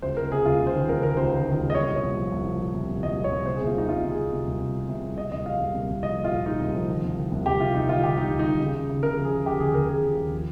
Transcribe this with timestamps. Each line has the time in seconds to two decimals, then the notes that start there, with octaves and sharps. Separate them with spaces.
0.02 C#2 C5
0.17 C#2 A#4
0.31 C3 G#4
0.45 C#2 F4
0.60 C#2
0.67 C5
0.74 D#3
0.88 C#2 A#4
1.03 D#3 A#4
1.17 C#2 C5
1.31 D#3
1.45 D#3
1.60 C#2
1.70 D#5
1.75 C2 C#5
1.88 A#2
1.96 C#5
2.03 C2
2.17 F3
2.32 C2
2.46 F3
2.60 A#2
2.74 C2
2.89 C2
3.03 C2 D#5
3.17 A#2
3.24 C#5
3.31 C2
3.45 C3 C5
3.56 G#4
3.60 C3
3.67 F4
3.75 C2 D#4
3.89 C2 F4
4.03 C3
4.10 G#4
4.17 C3
4.32 C3
4.46 C2
4.60 C2
4.75 C2
4.89 C3
5.03 C2
5.17 C2 D#5
5.32 C2 D#5
5.46 A#2 F5
5.60 C2
5.74 C2
5.89 C2
6.03 F3 D#5
6.17 A#2
6.24 F4
6.31 A#2
6.46 A#2 D#4
6.60 C2
6.74 F3
6.89 D#3
7.04 C2
7.17 D#3
7.32 C2
7.46 C2 G4
7.60 C3 F4
7.74 C2 D#4
7.89 D#3 F4
8.03 D#3 G4
8.17 C2 D#4
8.32 C2
8.39 D#4
8.46 D#3
8.60 C#3
8.75 C#3
8.89 C#3
9.03 C#3 A#4
9.18 F3
9.25 G#4
9.32 C#3
9.46 C#3 G4
9.60 D#2 G#4
9.74 D#2 A#4
9.89 D#2 G#4
10.03 F3
10.18 D#2
10.32 F3